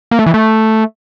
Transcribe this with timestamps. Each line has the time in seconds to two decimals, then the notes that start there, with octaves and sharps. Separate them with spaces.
0.11 A#3
0.19 A3
0.26 E3
0.34 A3